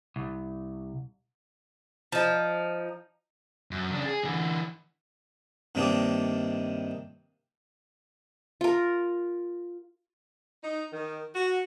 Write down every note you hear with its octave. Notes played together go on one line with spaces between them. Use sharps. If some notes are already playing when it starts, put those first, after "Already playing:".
C2
F3 D#4
F#2
C#3 D4
G#4
D3 E3
G2 C3 D#3 A#3 D4 D#4
F4 A#4
D#4
D#3
F#4